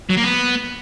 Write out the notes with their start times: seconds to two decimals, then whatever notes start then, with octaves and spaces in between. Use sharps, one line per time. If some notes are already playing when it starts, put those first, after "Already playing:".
0.10 F#3
0.17 A#3
0.24 B3